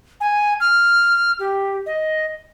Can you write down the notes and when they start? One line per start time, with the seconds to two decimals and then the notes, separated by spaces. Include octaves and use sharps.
0.21 G#5
0.60 F6
1.39 G4
1.86 D#5